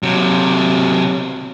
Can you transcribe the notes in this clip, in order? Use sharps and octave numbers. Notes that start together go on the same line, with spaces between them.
C3 F#3